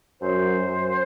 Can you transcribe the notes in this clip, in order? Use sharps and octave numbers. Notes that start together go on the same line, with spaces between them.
F#2 C5
F#2